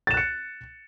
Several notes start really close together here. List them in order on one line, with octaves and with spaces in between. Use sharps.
A6 E7 F#6 C#7